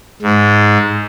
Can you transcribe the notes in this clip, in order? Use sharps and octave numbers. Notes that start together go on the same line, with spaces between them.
G#2